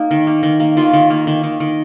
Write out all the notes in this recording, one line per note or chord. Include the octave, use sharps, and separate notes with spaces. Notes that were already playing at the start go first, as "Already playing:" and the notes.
Already playing: A#3 D#4
D#3
A#3
D#3
A#3
D#3 F4
D#3
A#3
D#3
D#3
D#3